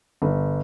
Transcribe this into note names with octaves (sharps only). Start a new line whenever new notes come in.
G1